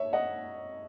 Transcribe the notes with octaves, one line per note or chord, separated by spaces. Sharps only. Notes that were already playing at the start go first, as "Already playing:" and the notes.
Already playing: C#5 E5
D#5 F#5